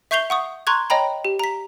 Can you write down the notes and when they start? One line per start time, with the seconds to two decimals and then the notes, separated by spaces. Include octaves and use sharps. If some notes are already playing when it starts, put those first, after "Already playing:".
0.11 E5 C#6 G6 C7 F7 G7
0.30 F#5 C#6 D#6
0.67 A#5 C6 C#6 F#6 G#6
0.90 C#5 D#5 G5 A#5 B5
1.25 G4
1.39 A#5 B6